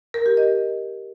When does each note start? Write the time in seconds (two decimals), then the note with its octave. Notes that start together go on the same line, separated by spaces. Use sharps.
0.14 A#4
0.26 G4
0.37 D#5